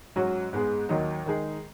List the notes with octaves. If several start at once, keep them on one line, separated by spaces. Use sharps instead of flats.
G#2 F#3 C#4 F#4
G#2 G#3 B3 G#4
D#2 D#3 F#3 D#4
D#3 G#3 D#4 G#4